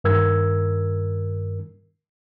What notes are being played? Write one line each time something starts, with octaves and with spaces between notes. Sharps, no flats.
G2 D#3 A#4 E6 G#6